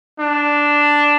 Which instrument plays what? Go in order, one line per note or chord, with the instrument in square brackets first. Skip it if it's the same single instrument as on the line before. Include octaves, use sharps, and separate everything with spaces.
[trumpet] D4